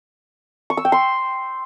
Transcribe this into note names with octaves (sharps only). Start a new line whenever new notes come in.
C#6
E6
G5
C6